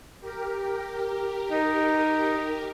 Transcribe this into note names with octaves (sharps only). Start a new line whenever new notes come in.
G4 A#4
D#4